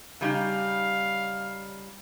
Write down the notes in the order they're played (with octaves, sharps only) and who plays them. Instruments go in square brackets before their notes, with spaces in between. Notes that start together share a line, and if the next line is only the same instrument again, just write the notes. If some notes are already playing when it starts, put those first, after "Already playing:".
[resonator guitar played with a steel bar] C#3 G3 D#4 [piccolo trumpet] F5